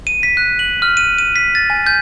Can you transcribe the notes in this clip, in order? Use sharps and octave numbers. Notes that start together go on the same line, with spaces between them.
D#7
B6
F#6
F#7
F6
D#7
D#7
B6
A6
G#5
G6